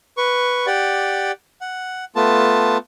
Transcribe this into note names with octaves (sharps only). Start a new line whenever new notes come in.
B4 C#6
G4 D5 F#5
F#5
A3 B3 F4 A5